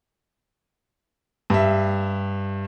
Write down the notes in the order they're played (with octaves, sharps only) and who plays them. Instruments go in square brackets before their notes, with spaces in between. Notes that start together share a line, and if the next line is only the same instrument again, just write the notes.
[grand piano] G2 E5